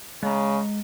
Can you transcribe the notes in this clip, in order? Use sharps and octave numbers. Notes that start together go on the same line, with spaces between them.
C#3 G#3 A#5